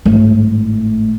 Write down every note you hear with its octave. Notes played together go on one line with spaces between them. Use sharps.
G#1 A2